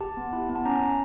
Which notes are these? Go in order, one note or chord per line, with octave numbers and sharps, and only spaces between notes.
G4 A5
B3
E4
B3
A5
C#4 A#5
C#4